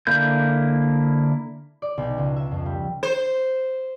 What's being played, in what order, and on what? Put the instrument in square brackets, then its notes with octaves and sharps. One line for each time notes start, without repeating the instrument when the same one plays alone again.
[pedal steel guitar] D3 A#3 E4 G6
[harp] D5
B1
C#2
E5
F2
G3
[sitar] C5